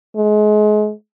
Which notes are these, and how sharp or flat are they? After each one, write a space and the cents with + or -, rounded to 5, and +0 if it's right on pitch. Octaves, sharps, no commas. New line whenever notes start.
G#3 +30